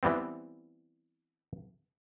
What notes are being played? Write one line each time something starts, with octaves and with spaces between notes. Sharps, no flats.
E3 G3 B3 C4